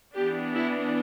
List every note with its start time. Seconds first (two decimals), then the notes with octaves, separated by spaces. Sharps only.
0.15 E3 B3 D4 G4
0.54 E4